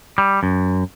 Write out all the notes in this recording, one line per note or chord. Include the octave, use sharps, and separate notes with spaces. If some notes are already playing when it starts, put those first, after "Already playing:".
G3
F#2